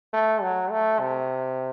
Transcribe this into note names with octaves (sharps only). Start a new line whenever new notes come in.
A3
F#3
A3
C3